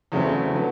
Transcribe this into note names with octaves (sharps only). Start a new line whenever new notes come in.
E2 C#3 F#3 A3 C4
D3 F#3 B3